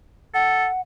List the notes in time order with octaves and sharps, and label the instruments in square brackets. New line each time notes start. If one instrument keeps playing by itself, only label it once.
[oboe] A4 [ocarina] F#5